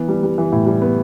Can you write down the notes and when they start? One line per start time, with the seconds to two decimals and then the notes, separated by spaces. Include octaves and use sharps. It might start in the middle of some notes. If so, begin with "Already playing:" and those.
Already playing: E3 B3
0.08 G3
0.23 G3
0.38 E3
0.52 A2
0.66 G3
0.82 B3